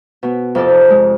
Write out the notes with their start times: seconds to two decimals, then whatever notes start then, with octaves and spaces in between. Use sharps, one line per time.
0.23 B2 B3
0.55 F2 C3 A4 D5
0.68 D#4
0.90 G#3